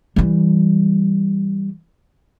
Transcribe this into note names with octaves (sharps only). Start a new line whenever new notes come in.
E3 G3